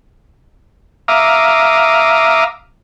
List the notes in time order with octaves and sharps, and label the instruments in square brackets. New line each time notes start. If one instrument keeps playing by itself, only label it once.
[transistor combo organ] E5 F5 A#5 D6 D#6